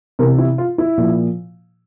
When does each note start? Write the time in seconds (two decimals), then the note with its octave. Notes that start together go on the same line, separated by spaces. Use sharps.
0.19 C3 E3 A#4
0.38 E4
0.58 F4
0.78 E4
0.98 A#2 F3